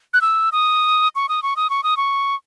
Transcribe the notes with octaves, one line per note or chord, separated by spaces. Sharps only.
F#6
E6
D#6
C#6
D#6
C#6
D#6
C#6
D#6
C#6